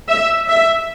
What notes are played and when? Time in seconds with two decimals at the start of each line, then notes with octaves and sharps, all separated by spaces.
0.08 E5
0.48 E5